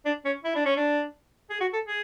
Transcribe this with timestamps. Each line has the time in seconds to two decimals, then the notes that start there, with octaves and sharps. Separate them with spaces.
0.06 D4
0.25 C#4
0.45 E4
0.55 D4
0.66 C#4
0.77 D4
1.50 G#4
1.61 F#4
1.73 A4
1.86 G#4